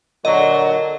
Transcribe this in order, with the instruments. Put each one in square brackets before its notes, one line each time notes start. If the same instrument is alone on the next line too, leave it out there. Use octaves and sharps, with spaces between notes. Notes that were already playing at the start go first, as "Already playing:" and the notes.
[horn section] A#2 D3 F#3 [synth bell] D#5